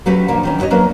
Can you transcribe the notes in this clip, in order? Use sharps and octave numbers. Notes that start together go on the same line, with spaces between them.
F#3 A3 C#4 F#4 G4 B4
A#2 D3 F3 A#3
D#3 E3 C#4
B3 E4 F#4 C#5 D#5
F#3 A#3 B3 D4 A#4 B4